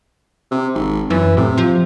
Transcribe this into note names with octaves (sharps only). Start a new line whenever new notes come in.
C3
G#1
F#2 E3
A2 C3
F3